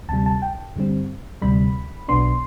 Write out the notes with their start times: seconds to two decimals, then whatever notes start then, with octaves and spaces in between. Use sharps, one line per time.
0.09 D2 C3 G3 A5
0.26 A5
0.42 G5
0.76 G2 D3 G3 C4
1.42 D2 C3 G3 B5
2.08 B1 B2 B3 D4 C6